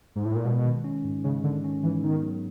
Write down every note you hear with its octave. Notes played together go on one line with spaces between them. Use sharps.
G#2
A2
A#2
B2 G#3
D#3
C#4
G#2
C#3 G#3
D3 D#3
C#4
G#2 E3
D#3 B3
F#3